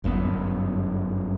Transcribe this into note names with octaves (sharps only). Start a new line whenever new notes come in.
G1 F#2 C#3 B3